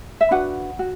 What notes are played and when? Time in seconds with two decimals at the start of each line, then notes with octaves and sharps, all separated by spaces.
0.21 E5
0.31 D4 F#4 B4 F#5
0.79 F#4